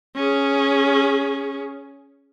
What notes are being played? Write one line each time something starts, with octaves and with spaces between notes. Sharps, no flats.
C#4 G#4